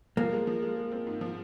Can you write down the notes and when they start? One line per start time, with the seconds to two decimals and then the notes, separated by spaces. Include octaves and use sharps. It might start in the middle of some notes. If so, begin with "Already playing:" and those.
0.17 F3 A#3
0.33 G#3
0.47 F3
0.62 G#3
0.77 G#3
0.92 C4
1.07 G#2
1.21 F3